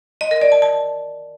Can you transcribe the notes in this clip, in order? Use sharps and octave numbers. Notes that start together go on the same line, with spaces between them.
D#5
A#4
D5
A5
A5